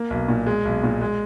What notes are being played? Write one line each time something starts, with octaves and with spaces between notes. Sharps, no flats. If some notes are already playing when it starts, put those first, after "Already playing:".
Already playing: A#3
B1
A#2
G#3
B1
A#2
G#3